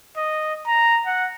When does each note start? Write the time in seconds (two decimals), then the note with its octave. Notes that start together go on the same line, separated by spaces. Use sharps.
0.17 D#5
0.67 A#5
1.06 F#5